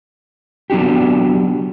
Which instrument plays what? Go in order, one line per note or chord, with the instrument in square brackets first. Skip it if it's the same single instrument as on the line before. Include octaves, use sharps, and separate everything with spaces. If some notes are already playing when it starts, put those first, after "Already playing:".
[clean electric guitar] F#3 B3 D4 F#4 G4